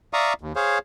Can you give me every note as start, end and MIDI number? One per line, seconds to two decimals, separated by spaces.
0.13 0.33 74
0.13 0.33 76
0.13 0.33 77
0.13 0.33 82
0.13 0.33 85
0.13 0.33 87
0.41 0.53 39
0.56 0.79 68
0.56 0.79 72
0.56 0.79 73
0.56 0.79 77